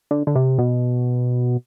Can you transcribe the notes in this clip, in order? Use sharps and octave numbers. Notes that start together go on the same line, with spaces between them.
D3
D3
C3
B2